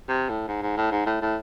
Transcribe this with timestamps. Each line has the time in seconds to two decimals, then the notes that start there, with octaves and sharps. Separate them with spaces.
0.09 C3
0.29 A2
0.48 G#2
0.62 G#2
0.77 A2
0.91 G#2
1.06 A2
1.21 A2